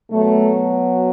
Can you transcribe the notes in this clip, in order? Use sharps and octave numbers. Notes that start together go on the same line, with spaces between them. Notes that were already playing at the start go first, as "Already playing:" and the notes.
B2 F#3 A3